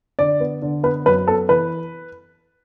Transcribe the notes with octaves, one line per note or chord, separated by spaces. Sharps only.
D3 D5
B3
D3
B3 B4
F#2 B4
B3 A4
E3 B4